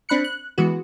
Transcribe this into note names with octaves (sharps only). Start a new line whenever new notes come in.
C4 D4 B5 F#6 C#7
F#6
E3 G#3 B3 F#4